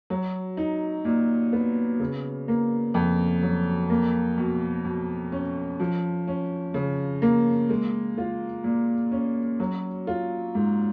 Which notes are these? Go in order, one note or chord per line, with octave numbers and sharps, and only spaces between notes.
F#3
D#4
A#2
B3
C#3
A#3
F2
F#3
A#3
B2
B2
C#4
F3
C#4
C#3
A#3
G#3
F4
A#2
C#4
F#3
F4
G#2